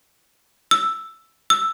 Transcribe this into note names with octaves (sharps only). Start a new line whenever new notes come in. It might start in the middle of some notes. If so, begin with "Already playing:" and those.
E6
E6